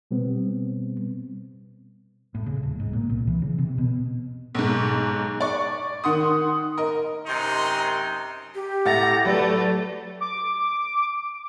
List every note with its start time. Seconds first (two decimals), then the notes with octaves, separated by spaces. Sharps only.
0.11 B2 G3 B3 C4
2.35 A2
2.46 C#3
2.63 D#1
2.80 G#2
2.93 A#2
3.09 C2
3.27 E3
3.42 C#3
3.58 C3
3.78 B2
4.55 B1 G#2
5.41 D5 C#6
6.04 D#3 F#5 C6 D#6
6.78 A#4 D#5
7.27 F#2 C3 D#4 C6
8.55 G4
8.86 A2 E5 F#5 A#5 A6 A#6
9.25 F#3 A3 A4 B4 D5
10.21 D6